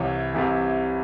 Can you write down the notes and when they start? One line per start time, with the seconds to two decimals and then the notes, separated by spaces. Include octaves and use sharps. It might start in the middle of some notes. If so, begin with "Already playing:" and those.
Already playing: C2 C3 E3 C#5
0.34 C2 C3 E3